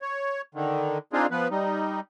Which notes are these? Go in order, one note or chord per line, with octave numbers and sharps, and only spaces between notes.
C#5
D3 D#3
C4 D4 D#4 F4 G#4
F3 B3 B4
G3 D#4